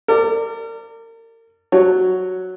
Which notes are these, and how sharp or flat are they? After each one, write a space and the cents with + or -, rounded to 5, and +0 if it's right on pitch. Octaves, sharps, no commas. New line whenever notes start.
A#4 -35 D5 +0
F#3 +0 C#5 +0